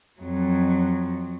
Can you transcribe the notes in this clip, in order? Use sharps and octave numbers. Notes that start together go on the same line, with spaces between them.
F2 F#3